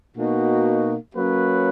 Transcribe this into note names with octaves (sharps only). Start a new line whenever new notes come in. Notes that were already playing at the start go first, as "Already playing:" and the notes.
B2 A#3 D#4 F#4
F#3 A#3 C#4 F#4 B4